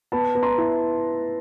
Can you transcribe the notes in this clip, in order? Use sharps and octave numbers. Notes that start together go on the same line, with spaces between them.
B3 A5 B5
B3
A#5 C6
E4